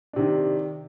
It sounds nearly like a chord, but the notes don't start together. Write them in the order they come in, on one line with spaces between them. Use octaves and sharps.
D4 C3 D#3